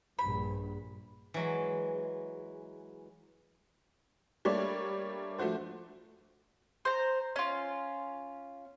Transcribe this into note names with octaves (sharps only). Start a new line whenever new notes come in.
A#1 G2 B5
E3 F#3 G#3
G3 A3 A#3 D4 C#5 D5
F3 A3 D4 F#4 C5
C5 A#5
C#4 F4